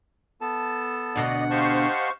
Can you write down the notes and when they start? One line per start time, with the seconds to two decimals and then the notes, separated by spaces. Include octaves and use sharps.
0.41 B3 A4 A5
1.16 D2 B2 D5 D#5 F#5
1.51 G4 C5 D#5 F5 A5 C#6